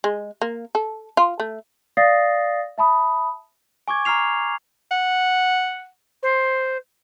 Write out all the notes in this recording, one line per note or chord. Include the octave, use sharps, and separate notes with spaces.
G#3
A#3
A4
F4
A3
D5 F5 D#6 A6 A#6 C7
E5 A5 B5 D#6
G#5 C#6 D6 G#6
A#5 C#6 F6 C7 F7
F#5
C5